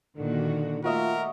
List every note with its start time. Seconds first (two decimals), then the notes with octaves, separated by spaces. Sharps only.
0.18 A#2 D3 D#3 F#4
0.84 A3 F4 F#4 A#4 D#5 E5